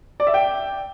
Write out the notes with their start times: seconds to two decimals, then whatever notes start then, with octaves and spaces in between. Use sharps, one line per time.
0.20 D5
0.27 E5
0.34 G5